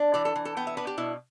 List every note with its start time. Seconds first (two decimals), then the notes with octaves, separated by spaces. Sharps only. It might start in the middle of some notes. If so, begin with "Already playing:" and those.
Already playing: D4
0.14 E3 D5
0.25 A4
0.36 E3
0.45 A4
0.57 B3 G5
0.67 E5
0.77 D4 B4
0.87 G4
0.98 B2 E4